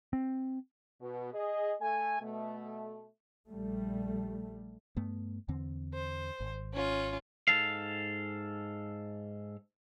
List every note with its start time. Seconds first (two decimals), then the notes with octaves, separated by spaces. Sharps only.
0.13 C4
1.01 B2
1.34 G#4 D#5
1.81 A3 A4 G#5
2.21 B2 A3
3.49 A#1 G3 A3
4.97 G2 A3 B3
5.48 E2 D3 C4
5.93 C5
6.40 G#1
6.72 C#4 F4
7.48 G#2 A4 F5